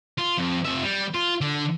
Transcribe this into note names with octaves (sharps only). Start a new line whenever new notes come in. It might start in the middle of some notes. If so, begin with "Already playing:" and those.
F4
F2
F2 E5
G3
F4
D3